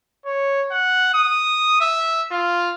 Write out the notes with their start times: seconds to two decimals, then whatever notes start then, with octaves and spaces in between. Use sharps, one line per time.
0.25 C#5
0.71 F#5
1.14 D#6
1.81 E5
2.31 F4